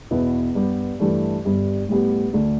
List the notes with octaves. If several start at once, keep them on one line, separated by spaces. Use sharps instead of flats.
E2 B2 B3 E4 B4
G2 G3 B3 G4
G2 E3 A3 D4 G4
G1 G2 G3
A2 G3 B3 G4
D2 D3 A3